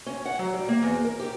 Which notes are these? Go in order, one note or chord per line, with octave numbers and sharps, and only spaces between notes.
C#4
F#5
F#3
G3
A#3
E2
A#4
G4